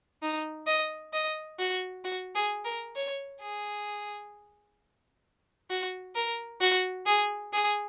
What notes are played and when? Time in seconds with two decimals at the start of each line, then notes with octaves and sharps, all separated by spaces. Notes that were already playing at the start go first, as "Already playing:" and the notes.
0.22 D#4
0.67 D#5
1.13 D#5
1.59 F#4
2.04 F#4
2.35 G#4
2.65 A#4
2.96 C#5
3.41 G#4
5.70 F#4
6.15 A#4
6.61 F#4
7.06 G#4
7.53 G#4